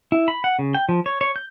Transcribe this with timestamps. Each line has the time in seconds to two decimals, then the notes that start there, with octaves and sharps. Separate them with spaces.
0.12 E4
0.28 B5
0.44 F#5
0.59 C#3
0.74 G5
0.89 F3
1.06 C#5
1.21 C#5
1.36 G6